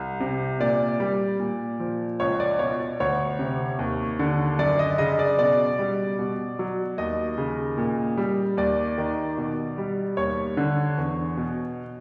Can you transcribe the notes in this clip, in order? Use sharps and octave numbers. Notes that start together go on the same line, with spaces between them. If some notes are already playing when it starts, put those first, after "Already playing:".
Already playing: C2
C3
A#2 D5
G3
A#2
F3
C#2 C#5
D5
B2 C#5
D5
D2 C#5
C3
D#2
D3
F#2 D5
D#5
C#3 D#5
D5
B2 D5
G3
B2
F#3
D#2 D#5
C#3
A#2
G3
D#2 D5
D#3
B2
G3
D#2 C#5
D3
E2
B2